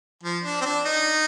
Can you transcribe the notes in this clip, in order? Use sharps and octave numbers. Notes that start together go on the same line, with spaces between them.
F3
D4
C4
D4
D#4